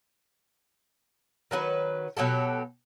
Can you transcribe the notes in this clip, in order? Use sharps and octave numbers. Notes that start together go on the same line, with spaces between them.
D#3 F#3 G4 B4
B2 F#3 G4 A4